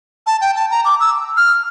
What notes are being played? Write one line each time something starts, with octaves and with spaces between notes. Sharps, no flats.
A5
G5
A5
A#5
D6
E6
F6